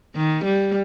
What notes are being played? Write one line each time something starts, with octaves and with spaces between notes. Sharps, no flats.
D#3
G3